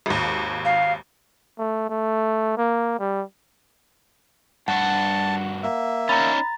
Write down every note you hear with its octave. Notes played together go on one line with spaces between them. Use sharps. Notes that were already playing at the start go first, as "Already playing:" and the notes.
G#1 D#2
F5
A3
A3
A#3
G3
G2 F#4 F#5 A5
A#3 E5
C#4 D#4 A#5 B5 A6